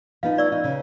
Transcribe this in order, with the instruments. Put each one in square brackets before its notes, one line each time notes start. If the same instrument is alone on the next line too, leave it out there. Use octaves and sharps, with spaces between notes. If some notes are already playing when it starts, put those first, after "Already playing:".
[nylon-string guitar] F3 B3 D#4 [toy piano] F5
[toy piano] D5 C#6 E6
[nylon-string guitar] D#4
C#3